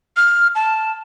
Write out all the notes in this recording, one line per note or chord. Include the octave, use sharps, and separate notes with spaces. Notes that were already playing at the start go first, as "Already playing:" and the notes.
F6
A5